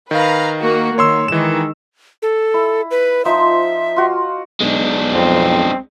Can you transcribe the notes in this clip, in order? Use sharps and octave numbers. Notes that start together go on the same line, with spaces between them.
D#3 B4 F5 A#5
A#3 F#4
D#3 A#3 C#5 C6 E6
D#3 E3 G#3 E7
A4
E4
B4
F3 D#4 C5 E5
F4 F#4 F5
B1 G#3 D4
F2 C4